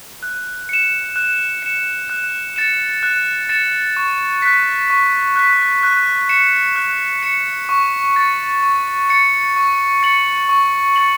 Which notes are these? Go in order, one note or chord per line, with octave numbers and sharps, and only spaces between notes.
F#6
C#7 E7
F#6
C#7 E7
F#6
A6 C#7 E7
F#6
A6 C#7 E7
C#6
F#6 B6
C#6
F#6 B6
F#6
C#7 E7
F#6
C#7 E7
C#6
A6 C#7
C#6
A6 C#7
C#6
A6 C#7 F#7
C#6
A6 C#7 F#7